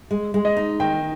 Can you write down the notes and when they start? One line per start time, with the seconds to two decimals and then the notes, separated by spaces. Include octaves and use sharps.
0.11 G#3
0.34 G#3
0.45 D#5
0.57 D#4
0.80 D#3 G5